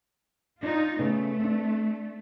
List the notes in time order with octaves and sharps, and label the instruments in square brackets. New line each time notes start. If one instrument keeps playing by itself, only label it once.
[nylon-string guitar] D4 [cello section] D#4 F4
[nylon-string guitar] C#3 B3 [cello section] A3
[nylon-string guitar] C4 D4